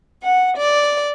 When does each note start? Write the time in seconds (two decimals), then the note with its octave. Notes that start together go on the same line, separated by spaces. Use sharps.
0.23 F#5
0.56 D5